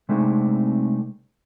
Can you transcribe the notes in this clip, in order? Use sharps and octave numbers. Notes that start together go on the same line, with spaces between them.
C3 G#3 A3 C4 D4 D#4